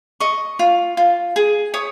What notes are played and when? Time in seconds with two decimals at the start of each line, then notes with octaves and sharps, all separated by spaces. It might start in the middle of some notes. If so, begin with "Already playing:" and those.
0.20 D#5 C#6
0.59 F4
0.97 F4
1.36 G#4
1.74 C#5 D#6